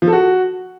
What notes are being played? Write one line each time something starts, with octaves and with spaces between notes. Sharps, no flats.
F3
A4
F#4